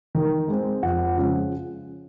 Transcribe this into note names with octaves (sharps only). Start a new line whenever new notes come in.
D#3
G#3 C4
F2 F#5
C#3 F3 G#3 C#4